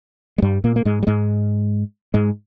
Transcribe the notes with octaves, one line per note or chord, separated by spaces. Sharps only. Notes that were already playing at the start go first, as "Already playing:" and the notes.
G#3
G2 G3
A#2 A#3
A#3
G#2 G#3
G3
G#2 G#3
G#2 G#3